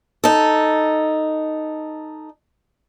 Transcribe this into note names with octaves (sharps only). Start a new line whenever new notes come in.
D#4 A4